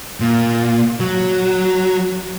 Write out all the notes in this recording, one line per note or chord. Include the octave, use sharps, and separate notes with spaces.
A#2
F#3